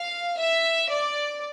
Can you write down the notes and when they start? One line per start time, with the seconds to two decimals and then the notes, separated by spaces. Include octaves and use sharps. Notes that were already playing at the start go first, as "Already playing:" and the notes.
Already playing: F5
0.39 E5
0.90 D5